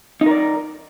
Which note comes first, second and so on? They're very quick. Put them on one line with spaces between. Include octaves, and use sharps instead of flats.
D#4 A#4 D5